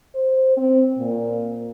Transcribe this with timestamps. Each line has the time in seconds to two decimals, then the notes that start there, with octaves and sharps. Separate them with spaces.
0.15 C5
0.57 C4
0.99 A#2